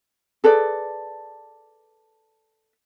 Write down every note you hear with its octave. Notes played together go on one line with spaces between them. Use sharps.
G#4 A4 B4 D5